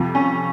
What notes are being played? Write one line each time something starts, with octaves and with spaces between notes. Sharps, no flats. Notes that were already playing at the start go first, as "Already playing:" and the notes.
Already playing: F2 C3 F3
C#4